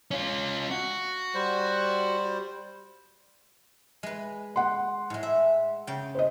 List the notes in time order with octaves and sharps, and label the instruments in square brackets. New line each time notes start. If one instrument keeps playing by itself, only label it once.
[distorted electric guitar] C#4 F4
F#4
[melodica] G3 C5
[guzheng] G#3 B4
[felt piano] F#5 C6
[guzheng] A2 G#3
E5
C#3 G5
[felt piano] C5 D#5